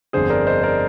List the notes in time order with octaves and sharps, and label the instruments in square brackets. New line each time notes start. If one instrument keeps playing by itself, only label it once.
[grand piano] G1 F2 D3 G#4 C5
A#4 D5
C5 D#5
A#4 D5